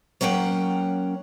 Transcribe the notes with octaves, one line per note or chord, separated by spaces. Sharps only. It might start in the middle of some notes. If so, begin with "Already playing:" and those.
F#3 A#3 C#4 F#5 G5